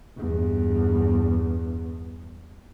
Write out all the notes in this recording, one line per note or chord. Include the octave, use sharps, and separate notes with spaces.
E2 G2